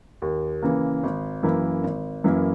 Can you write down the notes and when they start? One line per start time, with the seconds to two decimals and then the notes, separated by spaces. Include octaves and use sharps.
0.22 D#2
0.62 C#3 E3 A#3
1.04 G#1
1.43 F#2 E3 A#3 E4
1.84 G#1
2.24 F#2 E3 A#3 E4